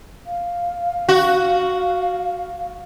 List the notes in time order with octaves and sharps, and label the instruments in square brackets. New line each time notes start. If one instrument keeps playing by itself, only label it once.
[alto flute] F5
[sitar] F#4